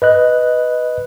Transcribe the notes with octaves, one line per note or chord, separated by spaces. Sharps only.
B4 D#5 F#6